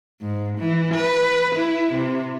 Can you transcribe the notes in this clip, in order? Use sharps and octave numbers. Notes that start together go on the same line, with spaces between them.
G#2
E3
B4
E4
C3